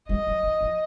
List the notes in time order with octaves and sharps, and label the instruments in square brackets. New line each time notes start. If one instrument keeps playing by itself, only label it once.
[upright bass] G3 [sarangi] D#5
[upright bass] F#3
E3
F3